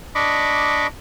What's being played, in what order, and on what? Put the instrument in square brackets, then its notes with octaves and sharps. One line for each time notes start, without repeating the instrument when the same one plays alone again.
[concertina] D4 D#5 B5 C#6 D6